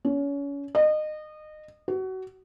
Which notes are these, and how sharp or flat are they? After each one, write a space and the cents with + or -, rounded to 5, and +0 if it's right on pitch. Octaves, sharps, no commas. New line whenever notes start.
C#4 +30
D#5 -25
F#4 +25